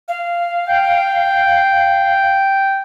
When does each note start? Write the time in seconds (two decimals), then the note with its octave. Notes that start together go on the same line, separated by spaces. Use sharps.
0.08 F5
0.69 G5